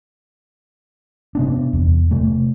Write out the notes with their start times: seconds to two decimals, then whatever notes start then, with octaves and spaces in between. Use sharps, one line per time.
1.35 C3 B3 D4
1.73 E2
2.11 C3 A3